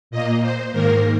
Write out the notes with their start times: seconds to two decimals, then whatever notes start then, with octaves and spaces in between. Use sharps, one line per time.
0.11 A#2 A#3 D#5
0.42 C5
0.72 G#2 D#3 A#3 A#4